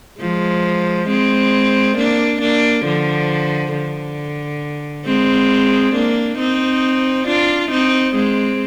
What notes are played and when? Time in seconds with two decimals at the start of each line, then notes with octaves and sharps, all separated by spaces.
0.21 F3 G#3
1.09 G#3 C4
1.97 A#3 D4
2.41 A#3 D4
2.86 D3 F3
3.74 D3
5.06 G#3 C4
5.94 A#3 D4
6.39 C4 D#4
7.27 D4 F4
7.71 C4 D#4
8.16 G#3 C4